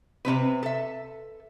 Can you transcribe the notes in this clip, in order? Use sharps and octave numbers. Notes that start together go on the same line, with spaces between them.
C3 F3 C4 B4
A4 E5